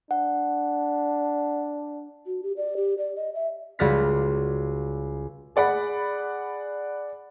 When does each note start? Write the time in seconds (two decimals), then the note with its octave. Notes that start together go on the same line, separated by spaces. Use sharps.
0.11 D4 F#5
2.26 F#4
2.43 G4
2.57 D5
2.77 G4
2.98 D5
3.16 D#5
3.34 E5
3.79 C#2 G3 F#4 D5 F6 B6
5.56 G#4 D5 F#5 B5